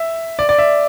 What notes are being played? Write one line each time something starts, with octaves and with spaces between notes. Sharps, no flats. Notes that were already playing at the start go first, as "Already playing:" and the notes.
Already playing: E5
D5
D5
E5